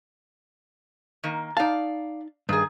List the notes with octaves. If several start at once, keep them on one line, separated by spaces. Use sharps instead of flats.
D#3 A#3
D#4 D5 F5 A5
G2 D#3 G#4